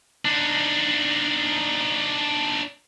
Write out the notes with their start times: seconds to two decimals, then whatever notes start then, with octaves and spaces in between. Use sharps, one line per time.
0.25 D4 D#4